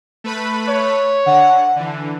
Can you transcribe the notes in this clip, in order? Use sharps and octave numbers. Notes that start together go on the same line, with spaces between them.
A3 B4 B5
C#5
D3 F#5
D3 E3